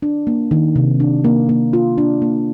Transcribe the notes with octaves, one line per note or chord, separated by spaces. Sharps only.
D4
A#3
D#3
C3
D4
A#3
A#3
F4
D4
A#3